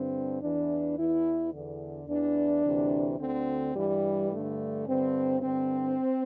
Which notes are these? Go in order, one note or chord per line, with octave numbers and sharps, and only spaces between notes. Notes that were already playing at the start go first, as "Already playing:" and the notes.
Already playing: G2 D3 C4
E2 E3 D4
E2 E3 E4
E2 D3
E2 E3 D4
D2 C3 E3
D2 D3 C4
G2 E3 G3
G2 D3 A3
G2 D3 C4
G2 D3 C4